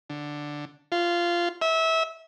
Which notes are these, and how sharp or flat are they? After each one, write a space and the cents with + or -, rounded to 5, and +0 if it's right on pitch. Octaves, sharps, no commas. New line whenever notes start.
D3 +5
F4 -15
E5 -25